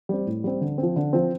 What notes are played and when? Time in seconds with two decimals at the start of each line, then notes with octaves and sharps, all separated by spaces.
0.09 G3 C4
0.26 A2
0.44 G3 C4
0.61 D3
0.78 C4
0.83 F3
0.96 D3
1.13 F3 C4